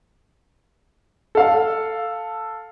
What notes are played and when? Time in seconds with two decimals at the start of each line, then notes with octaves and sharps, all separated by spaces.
1.35 A4 F5